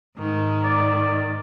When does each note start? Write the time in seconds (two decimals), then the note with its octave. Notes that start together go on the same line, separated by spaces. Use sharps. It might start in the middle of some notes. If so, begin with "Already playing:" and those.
0.17 G#2 D#3
0.64 D5